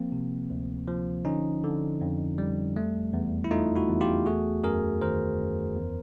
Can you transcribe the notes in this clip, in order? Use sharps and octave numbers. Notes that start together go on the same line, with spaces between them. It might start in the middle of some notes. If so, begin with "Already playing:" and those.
Already playing: F3 A#3 C4
C3
D2
F3
D3 C#4 D#4
D3
F2
G3
A3
E2
E4
A3 D#4 F4
E4 F#4
E2
F4 G4
A3 F#4 G#4
F#2 G#4 A#4
D#3 A#4 C5
F#2
E2